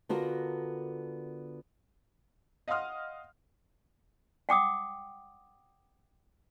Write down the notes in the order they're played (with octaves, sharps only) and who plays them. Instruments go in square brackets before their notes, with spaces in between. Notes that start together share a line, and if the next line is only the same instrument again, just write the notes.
[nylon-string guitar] D3 B3 F4 F#4 A#4
[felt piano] D#5 F5 F#5 C6 D#6 F6
[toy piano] F#5 G5 D6 D#6